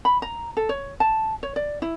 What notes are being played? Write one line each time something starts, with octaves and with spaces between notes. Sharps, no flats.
B5
A#5
A4
C#5
A5
C#5
D5
E4